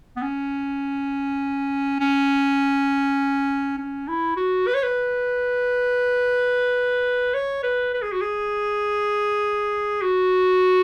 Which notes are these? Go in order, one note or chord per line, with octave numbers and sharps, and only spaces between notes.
B3
C#4
C#4
C#4
E4
F#4
B4
C#5
B4
C#5
B4
B4
G#4
F#4
G#4
F#4